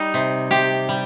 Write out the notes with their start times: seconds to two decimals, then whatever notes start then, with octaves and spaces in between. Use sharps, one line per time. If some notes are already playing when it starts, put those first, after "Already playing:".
Already playing: G3 D#4
0.14 C3
0.51 C3 G4
0.89 G3